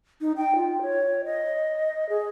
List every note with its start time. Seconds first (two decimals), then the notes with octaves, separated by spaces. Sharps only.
0.21 D#4
0.37 G5
0.56 F4
0.82 C#5
1.25 D#5
2.09 G#4